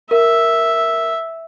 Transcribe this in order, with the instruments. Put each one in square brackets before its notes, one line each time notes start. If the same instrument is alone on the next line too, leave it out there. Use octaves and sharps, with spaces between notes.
[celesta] A#4 [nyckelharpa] E5